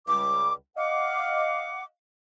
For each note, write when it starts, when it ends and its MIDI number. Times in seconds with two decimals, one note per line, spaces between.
0.07 0.52 37
0.07 0.52 55
0.07 0.52 86
0.77 1.83 75
0.77 1.83 77
0.77 1.83 78
0.77 1.83 86